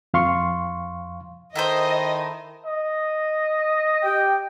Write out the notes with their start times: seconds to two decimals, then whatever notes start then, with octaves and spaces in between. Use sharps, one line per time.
0.14 F2 F5 C6 C#6
1.56 D#3 E4 A4 C5 D#5
2.66 D#5
4.03 G4 G5